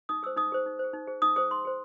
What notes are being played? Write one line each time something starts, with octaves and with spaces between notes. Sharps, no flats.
D#4 D#6
G#4 C5 E6
D#4 D#6
G#4 C5
D#4
G#4 C5
D#4
G#4 C5
D#4 D#6
G#4 C5 D#6
D#4 C6
G#4 C5